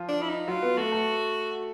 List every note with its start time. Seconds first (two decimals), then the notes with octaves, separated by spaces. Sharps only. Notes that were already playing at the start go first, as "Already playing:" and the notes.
Already playing: F3 F4
0.09 D4
0.22 E4
0.29 D#4
0.48 F#3 F4 F#4
0.62 B3 B4
0.77 A3 F#4 A4
0.92 A3 A4